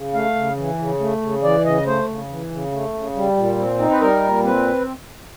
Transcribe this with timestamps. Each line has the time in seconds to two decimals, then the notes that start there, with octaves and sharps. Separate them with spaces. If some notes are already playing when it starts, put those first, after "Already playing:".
Already playing: C#3
0.14 A3 F5
0.36 C#3
0.57 E3
0.79 C#3
1.00 A3
1.21 C#3
1.43 E3 D5
1.64 C#3 D#5
1.86 A3 C5
2.08 C#3
2.29 E3
2.51 C#3
2.72 A3
2.94 C#3
3.15 G3
3.37 A#2
3.58 C4
3.79 D#4
3.90 B4
4.01 G3 A#4
4.23 A#2
4.44 C4 B4